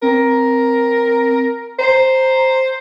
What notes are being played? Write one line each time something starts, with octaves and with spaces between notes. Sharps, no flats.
C4 A#4
C5 A#5